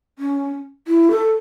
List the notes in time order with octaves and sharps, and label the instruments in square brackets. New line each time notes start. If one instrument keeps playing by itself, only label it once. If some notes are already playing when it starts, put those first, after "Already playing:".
[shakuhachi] C#4
E4
A4